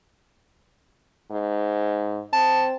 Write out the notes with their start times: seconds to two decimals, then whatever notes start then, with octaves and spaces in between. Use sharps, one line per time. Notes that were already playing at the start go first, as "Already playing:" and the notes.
1.31 G#2
2.33 C4 A5